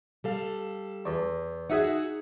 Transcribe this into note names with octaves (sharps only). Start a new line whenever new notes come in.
G3 A4 F5
E2
D#4 F#4 G#4 E5 F#5